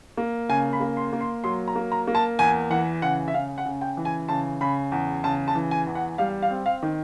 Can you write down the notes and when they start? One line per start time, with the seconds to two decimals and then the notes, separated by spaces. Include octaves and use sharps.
0.17 A#3
0.49 C#3 G#5
0.73 B5
0.80 A#3
0.97 C6
1.13 A#3
1.21 C6
1.44 F#3 C6
1.68 A#5
1.76 A#3
1.92 A#5
2.07 A#3
2.15 A5
2.39 E2 G#5
2.70 E3 F#5
3.02 C#3 F#5
3.28 E5
3.34 C#3 F5
3.58 F#5
3.66 C#3
3.81 G5
3.97 E3
4.05 G#5
4.29 C#3 A5
4.61 C#3 B5
4.92 E2
5.24 C#3 A5
5.48 A5
5.55 E3
5.71 G#5
5.87 E2
5.95 F#5
6.18 G3 F5
6.42 F5
6.50 C4
6.66 F5
6.83 D#3